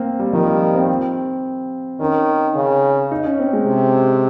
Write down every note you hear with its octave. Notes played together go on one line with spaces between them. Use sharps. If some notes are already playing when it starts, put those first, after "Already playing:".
Already playing: A#3 C4
G3
D#3 F3
G3
C4
D#3 C#4
C#3
D#4
C#4
C4
G#3
C3